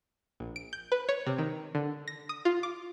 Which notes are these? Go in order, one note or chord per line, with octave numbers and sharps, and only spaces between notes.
A#1
D7
G6
B4
C#5
C3
D#3
D3
A#6
D#6
F4
D6